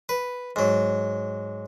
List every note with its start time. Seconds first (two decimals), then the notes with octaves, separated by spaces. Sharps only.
0.09 B4
0.56 G#2 F#3